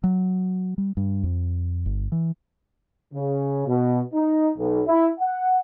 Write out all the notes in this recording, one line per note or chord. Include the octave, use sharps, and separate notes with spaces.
F#3
G3
G2
F2
G1
E3
C#3
B2
D#4
B1
E4
F#5